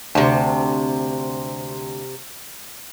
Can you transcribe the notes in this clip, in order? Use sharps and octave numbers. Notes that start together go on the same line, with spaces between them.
D2 C3 A5